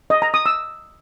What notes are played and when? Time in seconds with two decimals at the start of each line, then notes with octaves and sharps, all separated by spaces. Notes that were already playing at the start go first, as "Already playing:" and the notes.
0.10 D#5
0.22 A#5
0.34 D#6
0.46 E6